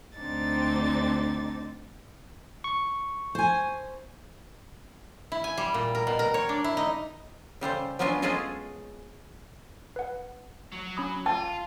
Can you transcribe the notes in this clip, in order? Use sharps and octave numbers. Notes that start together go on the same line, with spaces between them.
D2 C4 D4 D#4 A6
C#6
C5 G#5
E4
G#5
G3
A#2
A#4
B2
A#4
C#5
D4
E4
D#4
C#3 G3 A4 C5
F#3 B3 C#4 D4 F4 G#5
G#3 C#4 F4 G#4 A4 D#5
B4 F#5
F#3
C#4 B5 D#6
F4 A5